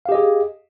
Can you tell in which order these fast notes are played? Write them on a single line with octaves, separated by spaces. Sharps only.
F5 G4 D#5 G#4